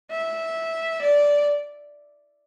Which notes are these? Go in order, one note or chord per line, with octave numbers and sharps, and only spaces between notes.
E5
D5